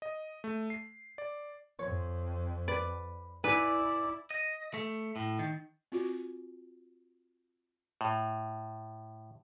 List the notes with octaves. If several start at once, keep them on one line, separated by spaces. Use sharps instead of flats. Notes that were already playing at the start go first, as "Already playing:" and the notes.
D#5
A3
C7
D5
F2 C#5
B4 D5
E4 B4 D5 G#5
D#5
A3
A2
D#3
C4 F4 F#4
A2